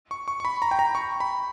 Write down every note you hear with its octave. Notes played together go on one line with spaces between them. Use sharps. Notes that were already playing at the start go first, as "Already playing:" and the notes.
C#6
C#6
C#6
B5
A#5
G5
A#5
C#6
B5